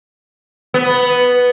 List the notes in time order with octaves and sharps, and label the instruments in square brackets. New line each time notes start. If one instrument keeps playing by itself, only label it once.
[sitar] B3